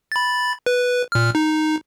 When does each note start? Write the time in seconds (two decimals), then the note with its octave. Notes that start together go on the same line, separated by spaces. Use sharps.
0.12 B5 A6
0.66 B4
1.12 A#2 F6
1.35 D#4